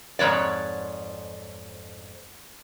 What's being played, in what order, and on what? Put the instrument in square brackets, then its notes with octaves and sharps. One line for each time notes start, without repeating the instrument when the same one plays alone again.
[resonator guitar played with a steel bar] F2 G#2 G#3 C#5 D5